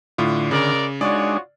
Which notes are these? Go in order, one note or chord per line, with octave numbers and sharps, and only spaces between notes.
A2 D3 F4
C#3 G#3 A#4 D5
G#3 D4 D#4 F4 F#4 C#5 D5